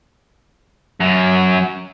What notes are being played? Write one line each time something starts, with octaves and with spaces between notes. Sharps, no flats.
F#2 F#3